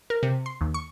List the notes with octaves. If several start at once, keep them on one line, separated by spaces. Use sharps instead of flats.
A#4
C3
C6
D#2
C#6